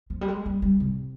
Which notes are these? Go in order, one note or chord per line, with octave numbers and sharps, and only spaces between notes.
F3
G3
G#3
G3
G3
C3